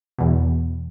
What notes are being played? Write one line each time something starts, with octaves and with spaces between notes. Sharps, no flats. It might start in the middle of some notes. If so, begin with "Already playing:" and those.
E2 B2